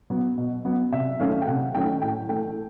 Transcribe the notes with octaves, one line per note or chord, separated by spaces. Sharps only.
F#3 B3
B2
F#3 B3
C3 E5
D#3 F#3 A3 C#4 F5
G5
C3 F#5
D#3 F#3 A3 C#4 G5
A2 G5
E3 A3 G5